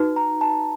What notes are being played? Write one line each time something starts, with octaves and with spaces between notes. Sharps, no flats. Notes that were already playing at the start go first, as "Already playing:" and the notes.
Already playing: D#4 F#4 B4
A#5
A5